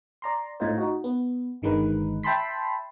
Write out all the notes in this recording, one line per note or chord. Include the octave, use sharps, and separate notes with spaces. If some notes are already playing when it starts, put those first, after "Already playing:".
D5 A#5 C6
A2 D#4 F4 C5
D#4 F#4
B3
G1 D3 D#3 G#3 D#4 B4
E5 G5 A5 B5 C6 B6